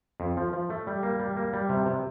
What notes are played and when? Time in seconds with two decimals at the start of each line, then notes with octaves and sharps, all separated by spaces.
0.20 F2
0.37 F3
0.53 F3
0.70 A3
0.87 G3
1.03 A#3
1.19 G3
1.37 A#3
1.53 G3
1.69 C3
1.86 C3